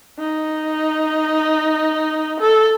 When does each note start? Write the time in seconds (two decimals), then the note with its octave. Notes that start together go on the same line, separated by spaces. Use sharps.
0.20 D#4
2.40 A4